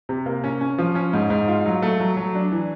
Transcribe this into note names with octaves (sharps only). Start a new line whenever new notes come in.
C3
A#3
C#4
C#4
F3
C#4
G#2
G#2
F4
F#3
A3
F#3
F#3
D4
E3